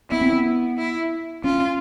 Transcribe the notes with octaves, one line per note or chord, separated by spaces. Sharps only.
B3 E4
C4
B3
E4
C#4 F4